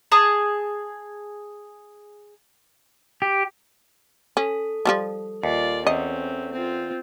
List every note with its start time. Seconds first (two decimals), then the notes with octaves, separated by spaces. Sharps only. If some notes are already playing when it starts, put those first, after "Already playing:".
0.12 G#4 A5 D#6
3.22 G4
4.37 C#4 A4
4.85 F3 G3 A3
5.43 D#2 F4 D5
5.87 E2 C4 C#4 D#5
6.52 C4 F4